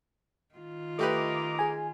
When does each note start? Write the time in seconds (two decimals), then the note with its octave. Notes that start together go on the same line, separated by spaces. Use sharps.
0.54 D#3 F4
0.99 A3 G4 B4 D#5 A#5 D6
1.59 G#4 G#5